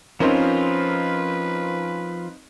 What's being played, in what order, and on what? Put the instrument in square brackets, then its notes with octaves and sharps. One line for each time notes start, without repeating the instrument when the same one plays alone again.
[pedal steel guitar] F3 F4 [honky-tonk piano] C4 D#4 A#4 [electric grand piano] C#4 [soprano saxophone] B4